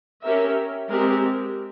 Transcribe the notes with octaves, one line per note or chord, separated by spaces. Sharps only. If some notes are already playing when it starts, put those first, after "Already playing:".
C#4 G4 A#4 E5
G#3 C4 G4 A#4